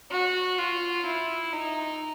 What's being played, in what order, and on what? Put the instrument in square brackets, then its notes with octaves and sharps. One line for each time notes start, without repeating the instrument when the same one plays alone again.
[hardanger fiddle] F#4
F4
E4
D#4